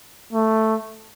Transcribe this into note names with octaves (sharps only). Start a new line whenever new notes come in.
A3